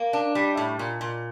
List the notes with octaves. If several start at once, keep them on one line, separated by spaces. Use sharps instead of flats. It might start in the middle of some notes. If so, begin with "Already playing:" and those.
Already playing: A#3
D4
G3
A2
A#2
A#2